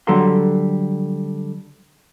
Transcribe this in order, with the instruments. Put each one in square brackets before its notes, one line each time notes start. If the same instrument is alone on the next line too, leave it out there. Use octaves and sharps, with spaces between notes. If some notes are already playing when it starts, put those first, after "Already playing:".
[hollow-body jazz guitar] D3 F#3 G3 A4 A#5 C6